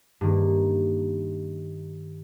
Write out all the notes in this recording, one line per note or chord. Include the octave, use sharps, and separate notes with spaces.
G2 D#3 A#3